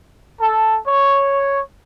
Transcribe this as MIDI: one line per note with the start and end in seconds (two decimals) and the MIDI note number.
0.40 0.77 69
0.87 1.59 73